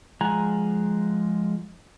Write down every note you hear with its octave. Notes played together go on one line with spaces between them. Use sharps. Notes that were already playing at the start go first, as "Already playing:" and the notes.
F3 G#3 F#5 G#5 A#5